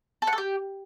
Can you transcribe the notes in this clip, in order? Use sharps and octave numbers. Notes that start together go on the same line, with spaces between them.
A4
F#5
A4
G4